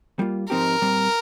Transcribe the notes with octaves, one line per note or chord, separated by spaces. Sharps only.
G3 A#3 F4
G#2 F3 C4 D#4 G4 A#4
A#2 G3 C4